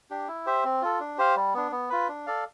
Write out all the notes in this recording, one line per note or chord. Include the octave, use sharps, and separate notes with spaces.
D4 G4
E4
G4 C5 E5
C4
F4 A4
D4
G4 C5 F5
G3
B3 D4
B3
F4 B4
D4
A4 D5 F5